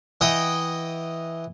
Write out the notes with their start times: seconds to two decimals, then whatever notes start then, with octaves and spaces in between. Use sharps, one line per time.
0.21 E3 D#5 F#5 G5